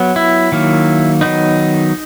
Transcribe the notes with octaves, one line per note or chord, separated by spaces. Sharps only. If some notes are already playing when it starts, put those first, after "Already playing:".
Already playing: F#3 B3
E4
D#3 F#3 A#3
D#3 F#3 B3 D#4